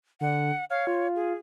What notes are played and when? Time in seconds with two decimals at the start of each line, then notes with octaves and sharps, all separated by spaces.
0.21 D3 F#5
0.70 C#5 F5
0.87 F4
1.15 G#4